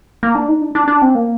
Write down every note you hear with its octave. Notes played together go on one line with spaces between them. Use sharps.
A#3
D4
D#4
D4
D4
D4
C4
A#3